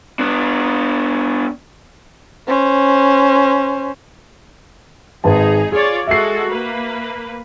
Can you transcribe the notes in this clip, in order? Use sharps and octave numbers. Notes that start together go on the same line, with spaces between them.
B3 D4
C#4 C5
G#1 D#4 G#4 B4 A5
F4 G#4 C#5 D5
G#3 F#4 A4 E5 C7
A#3 B4